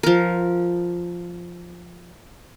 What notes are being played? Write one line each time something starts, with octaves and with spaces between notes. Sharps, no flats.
F3 A#4